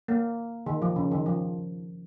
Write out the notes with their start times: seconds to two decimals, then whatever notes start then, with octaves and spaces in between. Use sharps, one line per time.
0.08 A#3
0.66 D#3
0.82 F3
0.96 C#3
1.11 D#3
1.26 F3